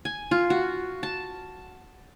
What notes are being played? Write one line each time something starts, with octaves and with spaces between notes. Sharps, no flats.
G#5
F4
F#4
A5